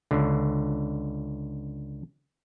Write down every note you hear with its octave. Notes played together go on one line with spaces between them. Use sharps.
C#2 D3